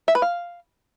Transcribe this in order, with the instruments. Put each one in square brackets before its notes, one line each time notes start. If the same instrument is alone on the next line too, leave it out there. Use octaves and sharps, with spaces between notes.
[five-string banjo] E5
B4
F5